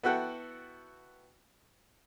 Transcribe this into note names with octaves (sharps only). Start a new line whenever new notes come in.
B3 E4 F#4 A4 F#5 G5